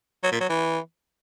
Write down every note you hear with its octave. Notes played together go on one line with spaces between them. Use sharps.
F#3
A#2
F#3
E3